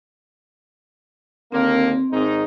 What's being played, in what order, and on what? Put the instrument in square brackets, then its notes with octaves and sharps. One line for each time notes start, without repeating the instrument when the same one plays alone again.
[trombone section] D#2 D3 A#3 [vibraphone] C4
[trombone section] G#1 G#2 D#4